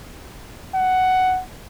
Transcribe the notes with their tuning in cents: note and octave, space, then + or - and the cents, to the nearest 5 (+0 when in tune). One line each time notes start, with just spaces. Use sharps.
F#5 +10